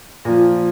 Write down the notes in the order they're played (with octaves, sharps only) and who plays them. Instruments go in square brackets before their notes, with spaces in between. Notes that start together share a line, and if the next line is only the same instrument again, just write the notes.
[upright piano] A#2 F3